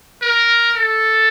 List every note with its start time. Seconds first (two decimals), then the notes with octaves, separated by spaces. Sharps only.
0.22 A#4
0.76 A4